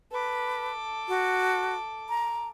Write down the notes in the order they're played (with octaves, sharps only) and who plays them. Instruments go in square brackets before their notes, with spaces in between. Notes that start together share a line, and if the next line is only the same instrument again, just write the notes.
[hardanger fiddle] A4 D6 [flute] B4
[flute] F#4
A#5